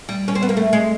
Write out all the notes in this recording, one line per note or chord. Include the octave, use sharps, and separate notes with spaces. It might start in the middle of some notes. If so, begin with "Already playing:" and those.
G3
C#4
C4
B3
A#3
A3
G#3